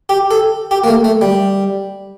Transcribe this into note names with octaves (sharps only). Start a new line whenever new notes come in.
G4
A4
G4
A#3
A3
A3
G3